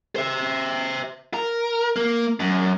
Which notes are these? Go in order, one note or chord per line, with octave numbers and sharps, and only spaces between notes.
C5 E5
A#4
A#3
F#2